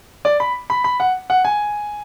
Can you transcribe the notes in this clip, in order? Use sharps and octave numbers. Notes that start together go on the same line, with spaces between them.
D5
B5
B5
B5
F#5
F#5
G#5